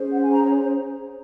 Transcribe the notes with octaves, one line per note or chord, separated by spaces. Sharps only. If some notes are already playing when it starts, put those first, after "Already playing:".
Already playing: C#4 G#4 C5
F#5
G#5
A#5
C#5